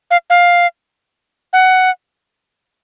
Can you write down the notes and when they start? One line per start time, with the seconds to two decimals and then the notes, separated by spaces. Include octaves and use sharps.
0.11 F5
0.30 F5
1.53 F#5